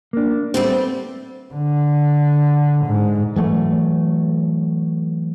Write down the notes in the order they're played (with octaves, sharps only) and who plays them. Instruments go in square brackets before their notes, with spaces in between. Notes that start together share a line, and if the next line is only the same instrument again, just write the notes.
[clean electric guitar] A#3 D4
[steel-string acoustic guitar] G3 A3 C4 [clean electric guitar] B3
[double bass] D3
G#2
[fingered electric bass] E3 F#3 A3